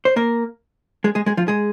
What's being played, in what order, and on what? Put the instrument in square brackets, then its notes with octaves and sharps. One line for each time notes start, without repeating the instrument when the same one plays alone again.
[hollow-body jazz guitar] C5
A#3 A#4
G#3 G#4
G#3 G#4
G#3 G#4
F3 F4
G#3 G#4